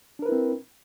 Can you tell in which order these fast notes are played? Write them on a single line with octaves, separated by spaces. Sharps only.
D4 A#4 B4 E4 C4